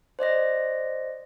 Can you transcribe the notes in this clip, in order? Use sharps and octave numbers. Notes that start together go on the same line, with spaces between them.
C5 D5 D#5 A#6